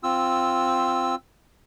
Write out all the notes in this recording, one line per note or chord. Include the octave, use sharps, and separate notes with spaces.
C4 F4 E6